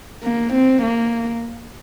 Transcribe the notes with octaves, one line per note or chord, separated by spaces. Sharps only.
A#3
C4
A#3